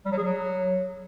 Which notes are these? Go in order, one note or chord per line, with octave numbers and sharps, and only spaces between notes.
G3
F#3
G#4
F#3